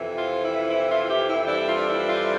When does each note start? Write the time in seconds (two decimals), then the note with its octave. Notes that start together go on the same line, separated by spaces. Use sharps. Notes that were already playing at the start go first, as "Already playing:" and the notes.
Already playing: F2 C3 E3
0.15 F4
0.41 E4
0.67 E4
0.87 F4
1.06 G4
1.26 E4
1.46 F2 E3 G3 D4 E4
1.66 F4
1.85 E4
2.05 F4